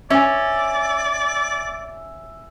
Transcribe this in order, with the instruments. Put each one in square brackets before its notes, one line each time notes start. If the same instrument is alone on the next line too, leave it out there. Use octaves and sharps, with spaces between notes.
[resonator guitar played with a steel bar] C#4 [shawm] D5 [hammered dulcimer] E5 G#5